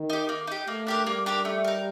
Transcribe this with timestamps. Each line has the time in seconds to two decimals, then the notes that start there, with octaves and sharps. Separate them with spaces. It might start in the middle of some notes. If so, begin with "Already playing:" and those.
Already playing: D#3
0.10 D#4 G4
0.29 A#3
0.47 D#4 G4
0.67 A3 A#3
0.87 D4 G4 A#4
1.06 G3 A#3
1.26 D4 G4 A#4
1.45 A3
1.64 D#4 A#4